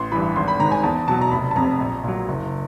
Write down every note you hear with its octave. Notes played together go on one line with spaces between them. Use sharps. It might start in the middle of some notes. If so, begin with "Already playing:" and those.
Already playing: A1 C6
G2 E3 B5
G#1 C6
B5
G#2 D#3 A#5
G#5
E2 A5
B2 F#3 A5
A#5
F1 B5
A5
F2 C3 A#5
A#1
A#2 F#3
F#1